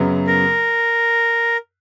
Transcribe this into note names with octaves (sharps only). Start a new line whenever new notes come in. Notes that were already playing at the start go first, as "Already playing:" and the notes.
Already playing: F#2 C#3 F#3 B3 F#4
A#4